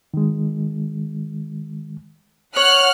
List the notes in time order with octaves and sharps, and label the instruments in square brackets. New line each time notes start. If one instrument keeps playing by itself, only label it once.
[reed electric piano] D#3 G#3
[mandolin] C#5 [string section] F#5 F6 F#6